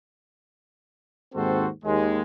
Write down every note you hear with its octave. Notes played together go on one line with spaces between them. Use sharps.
D#2 G#2 C4 F#4 A4 C5
D#2 G#3